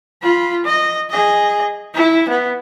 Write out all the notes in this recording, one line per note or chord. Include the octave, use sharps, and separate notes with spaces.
F4 B5
D#5
G#4 D#5
E4
B3